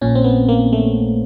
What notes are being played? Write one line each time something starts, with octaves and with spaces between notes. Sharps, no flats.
A#1 A#2 C#4
C4
B3
A#3
A3